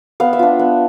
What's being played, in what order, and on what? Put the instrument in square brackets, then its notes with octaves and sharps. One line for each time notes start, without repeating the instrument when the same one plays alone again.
[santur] B3 F5
E5
D4 F4
B3